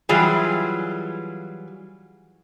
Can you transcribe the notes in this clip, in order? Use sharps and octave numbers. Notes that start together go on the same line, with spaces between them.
E3 F#3 G3 F4 G#4